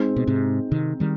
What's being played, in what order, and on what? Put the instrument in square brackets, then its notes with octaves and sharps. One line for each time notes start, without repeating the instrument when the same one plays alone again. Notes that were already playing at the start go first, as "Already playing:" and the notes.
Already playing: [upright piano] G#3 C4 D#4
[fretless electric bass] B2
G#2 C3
C3 D#3
D#3 G3